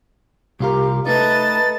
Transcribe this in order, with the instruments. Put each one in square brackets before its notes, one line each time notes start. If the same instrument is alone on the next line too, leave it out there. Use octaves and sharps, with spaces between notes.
[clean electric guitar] C2 F4 A#4 [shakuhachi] G4
[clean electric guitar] A3 D#4 [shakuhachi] B4 [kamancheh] D#5 A5 [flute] A6